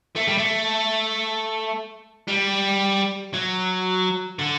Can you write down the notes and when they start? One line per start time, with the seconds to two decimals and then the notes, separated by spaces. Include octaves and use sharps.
0.16 A3
0.28 G3
0.38 A3
2.28 G3
3.34 F#3
4.39 D3